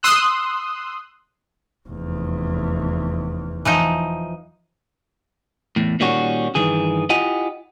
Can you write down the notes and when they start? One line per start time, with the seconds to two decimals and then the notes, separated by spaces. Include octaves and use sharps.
0.03 C6 D#6 E6 F#6
1.89 F1 E2
3.65 E3 F3 D#4
5.76 E2 A2
6.00 A#2 D#3 G3 C#4 F#4
6.55 G2 D#3 E3 G#4
7.09 E4 F4 G4 D#5 F#5 G#5